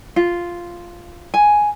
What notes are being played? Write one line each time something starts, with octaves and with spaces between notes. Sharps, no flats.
F4
G#5